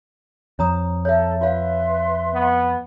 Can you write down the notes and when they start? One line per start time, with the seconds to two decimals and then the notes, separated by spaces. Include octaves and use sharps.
0.59 F2 C#5 A#5 D#6
1.05 A4 C#5 E5
1.41 F4 B4 C#5 E5 F5 C6
2.33 B3